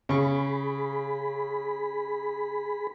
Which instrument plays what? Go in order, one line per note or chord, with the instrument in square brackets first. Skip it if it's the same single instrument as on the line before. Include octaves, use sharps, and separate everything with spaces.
[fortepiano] C#3 C#6 [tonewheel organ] G#4 B5